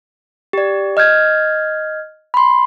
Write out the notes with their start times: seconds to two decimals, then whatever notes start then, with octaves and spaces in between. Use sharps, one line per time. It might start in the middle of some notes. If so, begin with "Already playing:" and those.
0.53 G4 D5
0.97 D#5 F6 G6 G#6
2.34 B5 C6